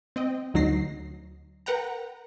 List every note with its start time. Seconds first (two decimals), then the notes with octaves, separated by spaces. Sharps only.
0.16 C4 D#5 G5
0.54 D2 F#3 D#4 A#6 C7
1.66 A#4 B4 F#5 G5 A#5